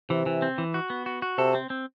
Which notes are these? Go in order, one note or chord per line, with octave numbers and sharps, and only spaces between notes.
C3 E3
E3
C4
E3
F#4
B3
F#4
F#4
C3 A4
C4
C4